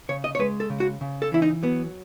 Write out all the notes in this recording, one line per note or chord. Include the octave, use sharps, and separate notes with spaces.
C#3 C#5
D#5
C#5
G#3 B4
A4
C#3
F#4
C#3
A4
E3 E4
D#4
F#3 B3